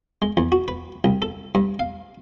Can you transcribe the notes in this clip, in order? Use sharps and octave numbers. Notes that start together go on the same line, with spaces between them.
G#3
E2
F#4
B4
C2
A4
G2
F5